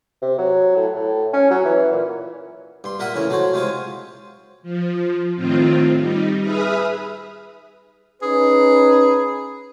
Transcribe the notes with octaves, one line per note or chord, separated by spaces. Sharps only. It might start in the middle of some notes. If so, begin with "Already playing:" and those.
C3
F#3
A2
A2
C#4
F#3
E3
A#2
G2 C6
A#2 A#4 E5 F#5 D#6
A2 C#3 E3 C#4
F#3 A3 F#4 C5 C#5
C3 G#3 F4 C#5 D#6
F3
A2 D#3 C4 F4
G3 D#4
G#4 B4 E5 B5 D#6 F6
C#4 D#4 G#4 B4